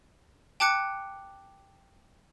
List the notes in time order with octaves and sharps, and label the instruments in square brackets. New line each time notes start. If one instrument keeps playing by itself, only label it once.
[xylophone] G5 A5 D6 F#6 C#7